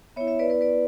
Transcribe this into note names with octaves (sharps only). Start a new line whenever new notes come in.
B3 E4 C#5 E5
C#5 E5
B4 D5
B4 D5
B4 D5